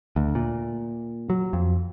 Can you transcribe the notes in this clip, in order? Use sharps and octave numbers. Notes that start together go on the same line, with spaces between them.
D2
A#2
F#3
F2